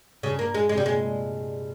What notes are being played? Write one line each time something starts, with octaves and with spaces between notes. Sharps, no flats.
G2 C#3
A#3
G#3
G#3
C3 G3
A#2 G#3